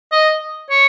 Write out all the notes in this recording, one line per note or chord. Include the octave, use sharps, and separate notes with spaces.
D#5
C#5